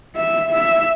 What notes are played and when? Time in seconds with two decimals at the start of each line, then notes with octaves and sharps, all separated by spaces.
0.15 E5
0.51 E5